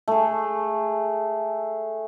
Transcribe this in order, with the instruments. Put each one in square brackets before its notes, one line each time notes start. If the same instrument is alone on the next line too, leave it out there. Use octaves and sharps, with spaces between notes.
[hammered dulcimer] A3 G#4